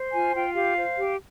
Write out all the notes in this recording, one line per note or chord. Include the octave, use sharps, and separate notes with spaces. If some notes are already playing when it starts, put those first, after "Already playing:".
Already playing: C5
F4 G#5
F4 G5
G4 F5
C5
G4